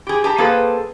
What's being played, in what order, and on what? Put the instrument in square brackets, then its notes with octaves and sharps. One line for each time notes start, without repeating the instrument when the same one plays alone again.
[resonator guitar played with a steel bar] G4 G#4
G4 A5 A#5
A#3 C4 G#4 A4 B4